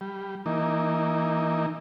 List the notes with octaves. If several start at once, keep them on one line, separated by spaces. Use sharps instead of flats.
G3
E3 A#3 D#4